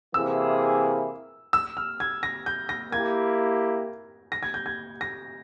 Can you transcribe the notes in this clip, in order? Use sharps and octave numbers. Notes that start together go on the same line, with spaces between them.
C3 E3 A#3 E4 G#4 E6
E6
F6
G#6
A#6
G6
A#6
A#3 E4 G4 G#6
A#6
G#6
G6
G#6
A#6